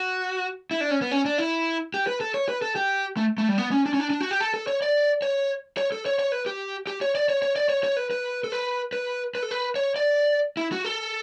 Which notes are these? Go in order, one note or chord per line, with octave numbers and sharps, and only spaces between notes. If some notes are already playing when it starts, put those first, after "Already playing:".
Already playing: F#4
E4
D4
C#4
B3
C#4
D4
E4
G4
B4
A4
C#5
B4
A4
G4
A3
A3
G3
B3
C#4
D4
C#4
D4
D4
F#4
G4
A4
A4
C#5
D5
C#5
C#5
A4
C#5
C#5
B4
G4
G4
C#5
D5
C#5
C#5
D5
C#5
C#5
B4
B4
A4
B4
B4
B4
A4
B4
C#5
D5
E4
F#4
A4